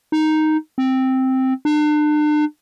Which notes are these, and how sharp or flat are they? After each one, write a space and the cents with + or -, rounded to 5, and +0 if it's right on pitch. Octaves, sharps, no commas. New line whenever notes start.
D#4 +0
C4 +0
D4 +40